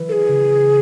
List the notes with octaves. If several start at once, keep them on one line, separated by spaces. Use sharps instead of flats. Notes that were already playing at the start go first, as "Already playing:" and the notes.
Already playing: E3
A4
G#4
C#3